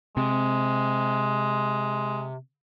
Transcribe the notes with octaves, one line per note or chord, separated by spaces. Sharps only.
C3 G#3